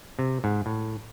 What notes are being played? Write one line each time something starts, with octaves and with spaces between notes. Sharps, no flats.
C3
G#2
A2